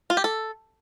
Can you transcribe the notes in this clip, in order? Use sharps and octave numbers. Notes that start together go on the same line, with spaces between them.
F4
G4
A4